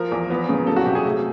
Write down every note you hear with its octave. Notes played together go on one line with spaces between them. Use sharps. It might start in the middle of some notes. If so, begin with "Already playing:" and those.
Already playing: F3 A#4
E2
B3
C#3
F#3 A4
F#4
C3 G4
G#4
A3